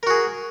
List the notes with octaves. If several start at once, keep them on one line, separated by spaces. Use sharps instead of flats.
F#4 G#4 A#4